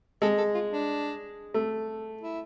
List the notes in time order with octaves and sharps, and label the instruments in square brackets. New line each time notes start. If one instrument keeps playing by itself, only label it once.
[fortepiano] G#3 [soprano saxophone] A4
[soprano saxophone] A4
F4
D4
[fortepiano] A3
[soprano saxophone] E4